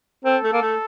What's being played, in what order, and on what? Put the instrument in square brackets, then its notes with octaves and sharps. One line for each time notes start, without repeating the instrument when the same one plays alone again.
[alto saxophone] C4 [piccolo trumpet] A4
[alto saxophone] A3
A#3
A3